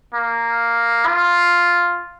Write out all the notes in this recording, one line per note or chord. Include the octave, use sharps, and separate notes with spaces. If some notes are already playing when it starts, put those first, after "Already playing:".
A#3
F4